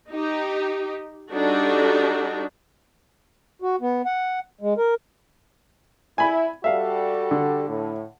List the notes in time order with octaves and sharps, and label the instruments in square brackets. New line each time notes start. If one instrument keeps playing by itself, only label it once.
[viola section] D#4 G4
G3 D4 D#4 F#4 A4
[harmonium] F#4
B3
F#5
G#3
A#4
[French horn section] E4 [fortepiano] G#5 B5
[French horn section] G3 F#4 A4 [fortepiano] E5 F5
[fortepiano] D3
[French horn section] A2